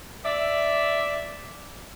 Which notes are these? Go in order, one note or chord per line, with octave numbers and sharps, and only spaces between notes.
D5 E5